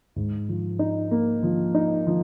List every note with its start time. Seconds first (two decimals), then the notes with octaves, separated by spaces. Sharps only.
0.16 G#2
0.49 F3
0.79 D#4
1.11 A#3
1.43 F3
1.74 D#4
2.07 F3